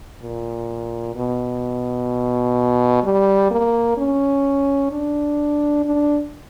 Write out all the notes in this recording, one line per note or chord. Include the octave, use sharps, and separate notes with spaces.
A#2
B2
G3
A#3
C#4
D4
D4